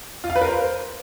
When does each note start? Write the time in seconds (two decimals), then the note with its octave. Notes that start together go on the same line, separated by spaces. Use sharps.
0.24 F4
0.30 F5
0.36 B4
0.42 A#4
0.47 C5